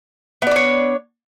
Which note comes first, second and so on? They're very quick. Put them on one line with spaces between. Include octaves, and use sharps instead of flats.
B3 D5 D4 C#5